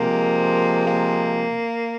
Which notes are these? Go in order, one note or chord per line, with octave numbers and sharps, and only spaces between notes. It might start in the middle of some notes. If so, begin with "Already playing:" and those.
Already playing: C3 F3 G#3 A#3
A#3